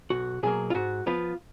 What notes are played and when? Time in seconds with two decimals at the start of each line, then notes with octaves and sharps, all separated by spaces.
0.10 B1 F#4
0.43 B2 F#3 A#3 G#4
0.70 F4
0.74 G#2 F#4
1.06 F3 B3 F4